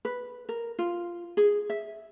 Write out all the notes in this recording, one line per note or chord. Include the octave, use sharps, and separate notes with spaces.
B4
A#4
F4
G#4
E5